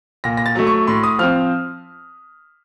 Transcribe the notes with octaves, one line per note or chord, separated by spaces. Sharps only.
A#2 A#6
A#6
A6
F#3 A3
C#6
A2 C6
D#6
F3 C4 F6